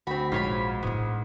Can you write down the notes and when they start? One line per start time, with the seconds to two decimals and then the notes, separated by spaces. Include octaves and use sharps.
0.07 D2 C4 F#4 B5
0.32 A#1 G#2 F4 C#5 B5
0.83 A2 B3 D4